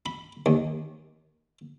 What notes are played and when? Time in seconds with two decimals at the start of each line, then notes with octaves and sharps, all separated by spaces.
0.06 B5
0.46 D#2